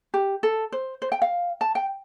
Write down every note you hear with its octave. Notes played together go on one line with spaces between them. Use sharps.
G4
A4
C5
C5
G5
F5
A5
G5